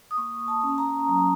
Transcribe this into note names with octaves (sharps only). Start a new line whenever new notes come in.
D#6
A#3 C#6
A5
C#4
A#5
F#3